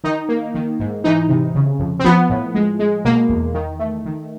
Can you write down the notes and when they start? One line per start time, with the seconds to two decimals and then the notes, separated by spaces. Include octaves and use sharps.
0.04 D#3 D#4
0.29 A#3
0.55 D#3
0.80 G#2
1.04 E3 D#4
1.29 C3
1.55 C#3
1.79 F2
1.99 C4
2.05 F3 B3
2.30 A2
2.55 G#3
2.79 G#3
3.05 B2 A#3
3.29 E2
3.54 D#3
3.79 A3
4.05 D#3